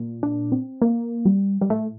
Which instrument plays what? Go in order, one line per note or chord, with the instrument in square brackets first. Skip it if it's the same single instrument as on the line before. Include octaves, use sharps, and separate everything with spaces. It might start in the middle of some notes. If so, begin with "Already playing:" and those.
Already playing: [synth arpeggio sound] A#2
D4
C4
A#3
G3
G3
A2 A3